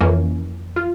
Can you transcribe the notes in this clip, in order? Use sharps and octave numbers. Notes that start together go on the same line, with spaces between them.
F2 E3 A#3 C#4
F4